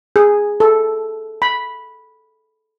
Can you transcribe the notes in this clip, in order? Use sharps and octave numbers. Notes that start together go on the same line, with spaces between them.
G#4
A4
B5